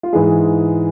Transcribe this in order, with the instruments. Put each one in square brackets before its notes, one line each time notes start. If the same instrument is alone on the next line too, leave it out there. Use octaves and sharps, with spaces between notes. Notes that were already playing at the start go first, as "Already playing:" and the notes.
[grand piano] F4
G#2 E3 G#3 G#4